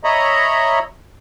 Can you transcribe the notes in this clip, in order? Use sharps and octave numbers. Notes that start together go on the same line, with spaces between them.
C#5 D#5 E5 A#5 B5